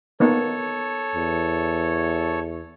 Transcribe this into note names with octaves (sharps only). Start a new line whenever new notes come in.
A#3 B3 D#4 A4 C#5
E2